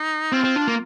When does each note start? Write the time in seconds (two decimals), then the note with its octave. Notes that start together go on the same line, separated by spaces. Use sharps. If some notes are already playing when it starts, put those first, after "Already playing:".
Already playing: D#4
0.32 C4 F4
0.44 C4
0.56 D4
0.68 A#3